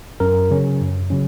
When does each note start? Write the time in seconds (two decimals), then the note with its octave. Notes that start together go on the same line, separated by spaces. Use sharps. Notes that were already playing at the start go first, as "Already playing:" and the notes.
0.20 F#2 A#4
0.50 C#3 F#3 C#4
0.81 F#2
1.10 C#3 F#3 C#4